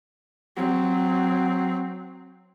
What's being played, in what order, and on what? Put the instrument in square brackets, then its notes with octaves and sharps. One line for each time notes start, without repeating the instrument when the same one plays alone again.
[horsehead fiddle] F#3 C4